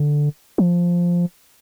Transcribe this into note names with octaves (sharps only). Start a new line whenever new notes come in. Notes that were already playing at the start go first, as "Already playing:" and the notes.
Already playing: D3
F3